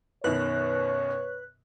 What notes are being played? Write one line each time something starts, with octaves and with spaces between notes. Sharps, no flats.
F#2 B2 D#3 B4 C#5 F#6